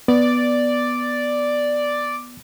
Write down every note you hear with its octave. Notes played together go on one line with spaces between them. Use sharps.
B3 D5